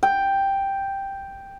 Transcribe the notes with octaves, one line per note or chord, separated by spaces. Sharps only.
G5